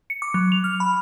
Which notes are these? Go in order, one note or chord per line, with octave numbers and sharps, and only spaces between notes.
C#7
D6
F#3
F7
F6
B5